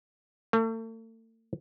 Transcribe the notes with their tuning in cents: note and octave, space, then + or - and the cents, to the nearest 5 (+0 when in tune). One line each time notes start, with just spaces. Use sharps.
A3 +40